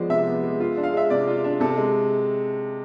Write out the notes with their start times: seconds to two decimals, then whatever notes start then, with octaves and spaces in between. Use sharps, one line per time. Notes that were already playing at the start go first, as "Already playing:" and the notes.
Already playing: F3 G#3 B3 C5 D5
0.10 C3 E5
0.27 B3
0.44 G#3
0.60 F4
0.77 D4
0.83 F5
0.93 G#3 E5
1.10 C3 D5
1.27 F4
1.44 D4
1.60 C3 A4
1.77 G#3